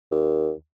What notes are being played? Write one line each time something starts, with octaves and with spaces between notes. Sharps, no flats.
D#2